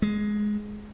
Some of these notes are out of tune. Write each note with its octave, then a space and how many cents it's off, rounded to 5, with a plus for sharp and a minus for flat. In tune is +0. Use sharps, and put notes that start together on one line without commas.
G#3 +10